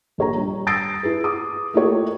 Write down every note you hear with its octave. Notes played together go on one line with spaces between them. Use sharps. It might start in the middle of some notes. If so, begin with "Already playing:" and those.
A#1 C#5 A#5
G3
D#6 E6 A6 A#6 C7 D7
E4 G#4 B4
D6 D#6
A3 A#3 E4 F4 G4 C#5